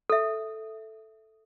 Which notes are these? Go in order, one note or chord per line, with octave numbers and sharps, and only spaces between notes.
A4 E5